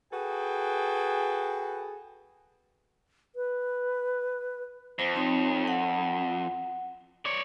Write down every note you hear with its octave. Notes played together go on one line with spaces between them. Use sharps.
F#4 G#4 A4 B4 G5
B4
F2 C5
C4 D#4 C#5
F#5
C#5 D5